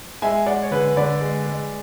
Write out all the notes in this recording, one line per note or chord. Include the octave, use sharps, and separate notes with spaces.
G#3 E5 G#5
G#3 D5 F#5
C#5
D3 G#4 B4
D3 B4 D5
G#3
G#3